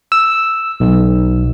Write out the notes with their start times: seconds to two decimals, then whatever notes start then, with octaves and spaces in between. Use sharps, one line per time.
0.12 E6
0.80 B1